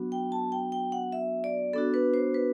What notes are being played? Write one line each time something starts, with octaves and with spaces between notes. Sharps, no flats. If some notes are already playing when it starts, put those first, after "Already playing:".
Already playing: F#3 B3 D4 F#4
G5
A5
G5
G5
F#5
E5
D5
B3 D4 F#4 A4
B4
C5
B4